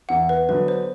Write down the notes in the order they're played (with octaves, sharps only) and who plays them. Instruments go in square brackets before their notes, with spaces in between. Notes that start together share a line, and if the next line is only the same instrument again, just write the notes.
[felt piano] E2 [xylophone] F#5
[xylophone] B4
[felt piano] D3 F#3 B3 [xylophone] B4
[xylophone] C5